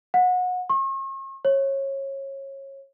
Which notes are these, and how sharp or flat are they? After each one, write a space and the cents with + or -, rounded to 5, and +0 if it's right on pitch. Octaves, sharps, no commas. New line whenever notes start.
F#5 -25
C#6 -45
C#5 -25